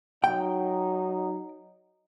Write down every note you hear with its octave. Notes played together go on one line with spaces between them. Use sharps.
F#3 D#4 G5